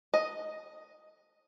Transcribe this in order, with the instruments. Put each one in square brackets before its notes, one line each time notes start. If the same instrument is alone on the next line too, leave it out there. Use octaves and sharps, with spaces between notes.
[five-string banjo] D#5